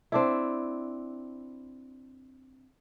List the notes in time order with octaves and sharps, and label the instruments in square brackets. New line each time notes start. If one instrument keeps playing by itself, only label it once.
[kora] C4 D4 E4